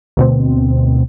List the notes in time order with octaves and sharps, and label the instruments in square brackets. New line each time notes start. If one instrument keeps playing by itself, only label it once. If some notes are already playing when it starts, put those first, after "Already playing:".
[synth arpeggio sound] D2 B2 C4